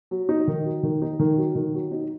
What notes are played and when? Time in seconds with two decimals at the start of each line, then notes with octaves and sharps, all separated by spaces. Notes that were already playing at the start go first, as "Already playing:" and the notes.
0.11 F#3
0.29 D#4
0.48 D#3
0.65 F#3
0.83 D#3
1.02 D#4
1.19 D#3
1.37 F#3
1.55 D#3
1.74 F#3
1.91 D#4